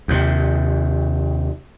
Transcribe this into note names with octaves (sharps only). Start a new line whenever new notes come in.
D#2 C3